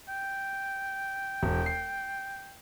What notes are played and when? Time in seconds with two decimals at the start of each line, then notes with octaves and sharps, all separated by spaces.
0.09 G5
1.43 E1
1.66 C7